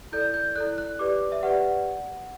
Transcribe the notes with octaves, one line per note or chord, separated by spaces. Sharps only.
E4 A4 D5 G6
G6
E4 A4 D5 F#6
F#6
G4 B4 D5 D6
E5
G4 B4 D5 F#5